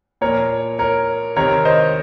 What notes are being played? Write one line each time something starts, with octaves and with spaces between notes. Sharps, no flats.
A#2 F3 A#4 C#5
A#4 C#5
C3 D#3 A#4 C#5
C5 D#5